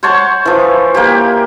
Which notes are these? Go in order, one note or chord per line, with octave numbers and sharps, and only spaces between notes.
C5 C#5 F#5 A5
E3 F3
A#3 G4